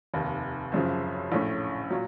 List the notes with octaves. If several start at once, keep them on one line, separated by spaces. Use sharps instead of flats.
F1 D#2 D#3
F#1 F#2 C#3 F3
A#1 A2 A3 C#4
A#2 F#3